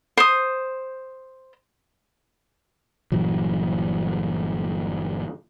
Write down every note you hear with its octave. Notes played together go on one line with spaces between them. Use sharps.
C5 D#6
G1 A#2 E3 F#3